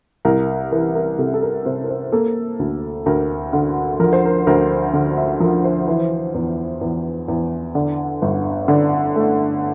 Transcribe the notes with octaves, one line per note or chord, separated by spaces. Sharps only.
C2 A#4
E3 A#4
A#4
C3 A4
A4
A#4
C3 C5
A#4
C5
A#3 A4
D2
D2 A#4
D3
F3 A#4
C5
A#4
D2 A#4
D3
E5
F3 A#4
C5
E3
E2
E2
E2
D3 D5
G1
D3 D5
A3